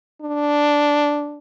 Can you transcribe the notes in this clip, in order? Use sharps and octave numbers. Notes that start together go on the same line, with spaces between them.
D4